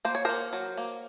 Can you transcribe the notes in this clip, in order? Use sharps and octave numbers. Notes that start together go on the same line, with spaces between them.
A#3 C5
C#5
A#3 A#4 C5
F#3
A#3